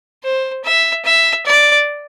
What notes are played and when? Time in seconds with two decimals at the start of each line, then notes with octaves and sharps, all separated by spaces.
0.24 C5
0.64 E5
1.05 E5
1.45 D5